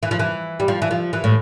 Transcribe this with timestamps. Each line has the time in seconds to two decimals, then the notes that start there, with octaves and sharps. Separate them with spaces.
0.03 E3
0.11 F3
0.19 E3
0.60 G3
0.68 F3
0.82 E3
0.91 F3
1.13 E3
1.24 A2